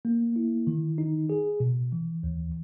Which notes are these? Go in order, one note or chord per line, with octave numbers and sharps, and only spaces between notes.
A#3
E4
D#3
D#4
G#4
B2
E3
D#2